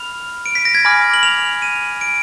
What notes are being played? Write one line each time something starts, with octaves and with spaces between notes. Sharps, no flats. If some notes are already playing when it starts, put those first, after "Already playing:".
Already playing: B5 F6 F7
D7
B6
A#6
G#6
G#5 B5 D6 F6 A#6
F#7
F7
D#7
D7